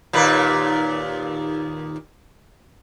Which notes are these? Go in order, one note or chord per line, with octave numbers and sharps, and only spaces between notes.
D#2 A#2 B4